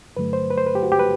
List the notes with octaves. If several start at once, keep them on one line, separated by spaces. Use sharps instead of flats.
G2 D3 F#3 A3 B4
C5
B4
C5
B4
G4
F#4
G4
B4